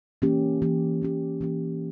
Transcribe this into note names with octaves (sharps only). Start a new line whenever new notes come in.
E3 A#3 C#4 G4
E3 A#3 C#4 G4
E3 A#3 C#4 G4
E3 A#3 C#4 G4